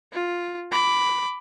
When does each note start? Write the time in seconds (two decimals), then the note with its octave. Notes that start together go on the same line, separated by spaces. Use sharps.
0.12 F4
0.72 B5 D6